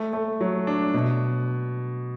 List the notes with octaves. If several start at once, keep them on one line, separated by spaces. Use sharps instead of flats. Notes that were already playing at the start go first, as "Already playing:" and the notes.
Already playing: A3
A3
F#3
D4
B2